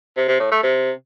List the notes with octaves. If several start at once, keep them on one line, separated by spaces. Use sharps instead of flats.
C3
C3
A2
A3
C3